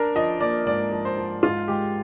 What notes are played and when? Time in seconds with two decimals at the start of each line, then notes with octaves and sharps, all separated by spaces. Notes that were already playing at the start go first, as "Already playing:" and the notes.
Already playing: D4 A#4
0.15 F3 D#5
0.40 A#3 D5
0.66 G#2 D5
0.92 F3
1.05 C5
1.17 F3
1.43 G#2 F4
1.68 G#3 G4